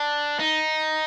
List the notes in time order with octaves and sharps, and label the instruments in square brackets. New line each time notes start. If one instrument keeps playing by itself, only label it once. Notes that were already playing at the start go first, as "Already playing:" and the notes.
Already playing: [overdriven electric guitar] D4
D#4